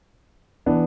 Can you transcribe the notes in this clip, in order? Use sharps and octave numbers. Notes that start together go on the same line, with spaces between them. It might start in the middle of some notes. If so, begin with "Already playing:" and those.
E3 B3 D4